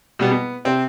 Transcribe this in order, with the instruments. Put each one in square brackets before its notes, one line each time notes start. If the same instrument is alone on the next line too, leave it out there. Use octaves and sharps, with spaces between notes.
[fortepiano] B2 G3 B3
B3
C3 C4